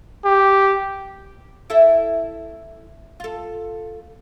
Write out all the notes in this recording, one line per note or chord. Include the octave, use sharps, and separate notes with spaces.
G4
E4 A4 E5
F4 A4